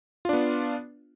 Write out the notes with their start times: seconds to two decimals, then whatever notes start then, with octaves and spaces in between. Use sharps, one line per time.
0.25 F4
0.29 D4
0.33 B3